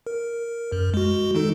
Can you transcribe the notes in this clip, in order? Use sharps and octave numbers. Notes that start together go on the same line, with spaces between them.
A#4
F#2
G#3 F#4
D#3 D#4 A4